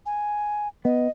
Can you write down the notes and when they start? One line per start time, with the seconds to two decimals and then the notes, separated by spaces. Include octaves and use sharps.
0.06 G#5
0.85 B3 D#5